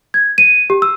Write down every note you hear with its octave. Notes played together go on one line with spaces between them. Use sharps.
G#6
D#7
G4
E6